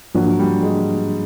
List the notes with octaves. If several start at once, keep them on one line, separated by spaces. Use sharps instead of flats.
G#2 F3 F#3 A#3 D4
G3
G#3